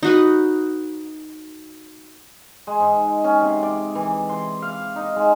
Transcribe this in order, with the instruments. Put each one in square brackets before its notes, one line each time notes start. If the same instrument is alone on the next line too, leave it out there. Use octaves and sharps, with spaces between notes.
[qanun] D#4 F#4 B4
[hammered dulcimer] G#3
G#2
C#4
C3
D5
E3
C6
F5
D#4
G#3